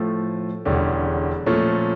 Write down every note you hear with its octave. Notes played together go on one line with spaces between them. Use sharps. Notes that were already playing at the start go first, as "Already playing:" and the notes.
Already playing: A2 F3 A3
E1 E2 D3 G3 C#4
A#2 F3 A3 C#4